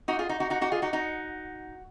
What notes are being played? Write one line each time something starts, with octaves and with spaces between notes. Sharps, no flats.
D#4 F#4
F4 G#4
D#4 F#4
D#4 F#4
D#4 F#4
D#4 F#4
F4 G#4
D#4 F#4
D#4 F#4